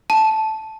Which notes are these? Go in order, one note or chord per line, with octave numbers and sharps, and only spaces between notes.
A5